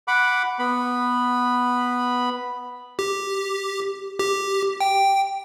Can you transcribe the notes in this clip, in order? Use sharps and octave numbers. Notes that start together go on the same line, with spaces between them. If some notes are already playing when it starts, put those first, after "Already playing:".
F#5 B5 D6
B3 B5
G4
G4
G5